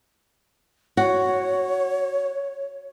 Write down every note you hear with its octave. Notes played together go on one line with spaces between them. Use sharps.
F#4 C#5